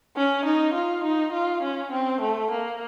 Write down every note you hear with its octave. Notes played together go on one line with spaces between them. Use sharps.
C#4
D#4
F4
D#4
F4
C#4
C4
A3
A#3